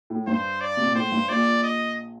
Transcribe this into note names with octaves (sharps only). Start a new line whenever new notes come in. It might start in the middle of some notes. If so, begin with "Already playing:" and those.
A2
G2 C5
D5
C3
A#2
A2 C5
G2
A#1 A#2 D5
D#5